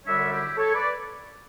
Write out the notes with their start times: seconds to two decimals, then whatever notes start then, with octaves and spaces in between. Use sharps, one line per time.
0.07 F#2 D3 G3 D4 C#5 E5
0.32 E4 G4
0.57 A4 C#5
0.74 B4 D5